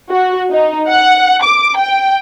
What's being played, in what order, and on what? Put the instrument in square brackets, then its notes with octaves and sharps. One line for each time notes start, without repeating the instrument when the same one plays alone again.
[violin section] F#4
D#4
F#5
D6
G5